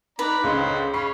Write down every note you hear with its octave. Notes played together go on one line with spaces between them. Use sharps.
D#4 B4 D5 A#5
C#2 D3 C#4 G#4 C5 D#5
C#4 B5 C#6 C7